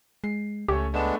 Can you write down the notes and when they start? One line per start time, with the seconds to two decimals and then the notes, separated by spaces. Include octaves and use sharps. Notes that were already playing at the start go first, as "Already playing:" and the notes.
0.24 G#3 C7
0.68 C#2 A3 C#4 G4 C#5
0.94 G#3 A3 B3 D4 B5 E7